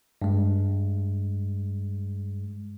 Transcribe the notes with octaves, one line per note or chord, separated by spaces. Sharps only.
G2 G#3